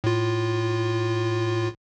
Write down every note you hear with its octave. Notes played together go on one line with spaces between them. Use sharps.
A2 F4